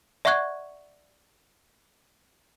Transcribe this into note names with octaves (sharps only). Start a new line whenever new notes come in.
D5 E5 F#5 C#6 F#6 G#6